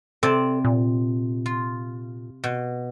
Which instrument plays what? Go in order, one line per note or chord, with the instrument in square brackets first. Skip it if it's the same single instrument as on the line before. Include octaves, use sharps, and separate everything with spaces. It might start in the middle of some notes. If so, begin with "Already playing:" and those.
[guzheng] C3 C4 D5 [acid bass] A4
[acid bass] A#2
[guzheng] F4
B2